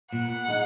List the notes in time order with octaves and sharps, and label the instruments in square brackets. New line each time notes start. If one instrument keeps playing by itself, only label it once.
[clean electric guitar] A#2 [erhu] F#5
[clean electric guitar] G#3 D#4